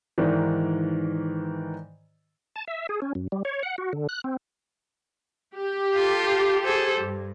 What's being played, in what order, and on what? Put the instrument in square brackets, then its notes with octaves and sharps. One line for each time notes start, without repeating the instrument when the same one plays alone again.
[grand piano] G#2 D#3 E3 D5
[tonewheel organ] A5
E5
G#4
C#4
F#2
G3
C#5
F#5
F#4
D3
F#6
C4
[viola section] G4
[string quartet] F4 A4
G#4 A4 C5
G2